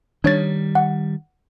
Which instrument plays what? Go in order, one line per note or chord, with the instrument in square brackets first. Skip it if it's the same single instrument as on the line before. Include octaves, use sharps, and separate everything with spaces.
[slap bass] D#3 G3 [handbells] D4 C#5 A6
[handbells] F#5